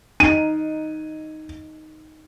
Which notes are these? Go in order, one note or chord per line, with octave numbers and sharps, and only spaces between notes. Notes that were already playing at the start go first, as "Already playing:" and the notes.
D#4 D#7